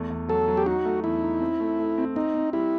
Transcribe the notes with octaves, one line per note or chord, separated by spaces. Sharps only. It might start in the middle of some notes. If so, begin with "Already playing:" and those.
Already playing: E2 A3
E2
F#3 A4
F#3
G4
D#4 F#4
A3
E2 E4
D#4
C4
A3
A3
C4
C4 D#4
C4
G3 E4